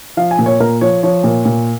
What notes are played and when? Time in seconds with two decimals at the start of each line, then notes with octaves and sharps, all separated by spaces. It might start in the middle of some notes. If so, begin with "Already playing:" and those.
0.17 F3 F5
0.31 G#5
0.39 A#2
0.46 C#5
0.60 A#2 A#4
0.81 F3 C#5
1.03 F3 C#5
1.24 A#2
1.45 A#2